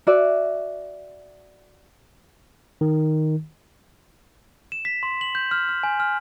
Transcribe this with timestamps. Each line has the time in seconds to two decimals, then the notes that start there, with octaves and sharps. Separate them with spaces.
0.07 F#4 D5 E5
2.81 D#3
4.72 E7
4.85 B6
5.03 C6
5.21 F#7
5.35 G6
5.51 F6
5.69 F6
5.83 G#5
6.00 F6